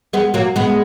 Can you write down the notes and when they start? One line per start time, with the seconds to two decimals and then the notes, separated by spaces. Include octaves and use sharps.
0.13 G#3 B3
0.34 F#3 A#3
0.56 G#3 B3